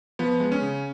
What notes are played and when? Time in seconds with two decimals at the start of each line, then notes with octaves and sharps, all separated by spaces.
0.19 F3 B3
0.40 G#3
0.52 C#4
0.61 C#3